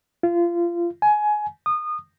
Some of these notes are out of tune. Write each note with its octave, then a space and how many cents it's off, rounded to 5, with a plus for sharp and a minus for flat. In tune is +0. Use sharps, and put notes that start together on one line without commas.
F4 -25
G#5 +20
D#6 -25